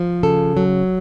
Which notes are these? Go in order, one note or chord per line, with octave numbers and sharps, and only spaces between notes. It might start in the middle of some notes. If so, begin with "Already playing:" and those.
Already playing: F3
C#3 A4
F#3